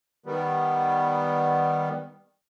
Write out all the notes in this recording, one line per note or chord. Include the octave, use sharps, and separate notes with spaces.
D#3 G3 B3